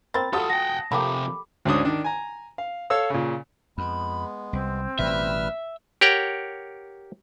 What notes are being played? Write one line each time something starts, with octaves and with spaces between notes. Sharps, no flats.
A#3 C4 B5 A6
F#3 A3 F4 G4 A4 A5 D#6
F#5 G5 A#6
C3 F3 A3 A#3 G4 B5 D6
D2 G#2 C#4 D4 D#6
D#3 D4
G#5 A#5
F5
A4 C#5 F5 E6
A#2 C#3
F2 G#3 B3 B5
C2 C4
A1 B2 G3 B4 E5 F6
G4 A#4 C#5 F#5 G5